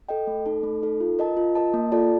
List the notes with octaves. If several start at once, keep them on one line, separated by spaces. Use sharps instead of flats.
A4 D#5 G5
A3
D#4 A4
A3
D#4 A4
F4
A#4 D#5 A5
F4
A#4 D#5 A5
A#3
F4 A4 D5 A5